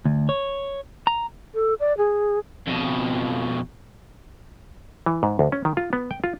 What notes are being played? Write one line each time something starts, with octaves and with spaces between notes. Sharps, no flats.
D2
C#5
A#5
A4
D5
G#4
F2 B2
E3
G#2
D2
C#4
D#3
F4
B3
G5
F4